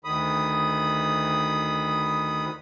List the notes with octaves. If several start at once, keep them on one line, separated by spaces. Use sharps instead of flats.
D2 D#3 B5 D#6